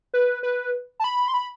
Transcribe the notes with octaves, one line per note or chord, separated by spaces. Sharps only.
B4
B4
A5
B5
C6
B5